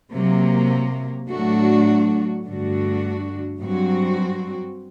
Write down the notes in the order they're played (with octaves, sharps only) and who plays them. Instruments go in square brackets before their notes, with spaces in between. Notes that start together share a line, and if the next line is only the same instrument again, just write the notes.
[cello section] C3 F#3 A#3
A2 F#3 A3 D4 F#4
G2 D3 A3 D4 F#4
G2 F#3 C4 F#4